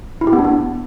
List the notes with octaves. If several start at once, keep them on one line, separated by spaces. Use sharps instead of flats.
E4
G4
B3
D4
B3